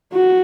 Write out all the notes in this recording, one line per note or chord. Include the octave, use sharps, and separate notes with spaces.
F#4